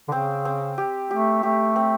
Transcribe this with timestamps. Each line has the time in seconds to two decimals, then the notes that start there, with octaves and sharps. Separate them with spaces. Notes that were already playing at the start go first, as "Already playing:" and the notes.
0.08 D3
0.12 C#3 C4
0.45 C4
0.78 G4
1.10 A3 G4
1.43 A3 G4
1.76 C4